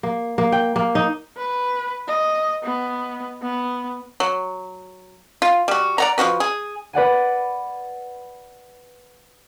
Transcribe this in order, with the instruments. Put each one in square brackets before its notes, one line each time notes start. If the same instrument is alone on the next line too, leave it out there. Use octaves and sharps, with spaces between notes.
[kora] A#3
A#3
G5
A#3
D#4
[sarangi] B4
D#5
B3
B3
[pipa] F#3
F4
G3 F#4
D5 F#5 A#5
F3 D4 F#4 B4
G#4
[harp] B4 D5 F#5 G#5